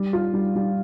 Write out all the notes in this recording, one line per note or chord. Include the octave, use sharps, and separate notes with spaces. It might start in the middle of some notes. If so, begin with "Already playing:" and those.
Already playing: G3
F4
G3
G3